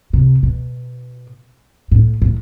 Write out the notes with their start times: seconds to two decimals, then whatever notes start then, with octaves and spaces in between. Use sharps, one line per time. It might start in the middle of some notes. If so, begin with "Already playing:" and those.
0.13 C3
0.43 B2
1.91 A2
2.22 A2